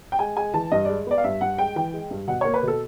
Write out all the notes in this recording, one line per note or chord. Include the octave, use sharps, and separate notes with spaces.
G5
G#3 G#5
G#3 G#5
E3 A5
G2 D#5
G#3 D5
B3 D5
F5
G2 E5
G2 F#5
G#3 G5
E3 G5
G#3
G2
B2 F#5
A#3 C#5
B4
B2 A4